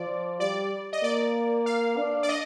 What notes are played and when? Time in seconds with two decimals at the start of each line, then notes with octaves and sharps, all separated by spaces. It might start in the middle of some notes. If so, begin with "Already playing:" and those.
Already playing: F3 D5
0.40 G3 D5
0.93 D#5
1.03 A#3 D5
1.66 F5
1.97 D4
2.23 D5
2.29 D#5